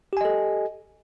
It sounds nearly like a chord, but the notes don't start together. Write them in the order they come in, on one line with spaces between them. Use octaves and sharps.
G4 G#5 D#5 A4